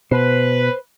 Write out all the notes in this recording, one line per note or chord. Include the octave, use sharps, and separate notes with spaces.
B2 B4 C5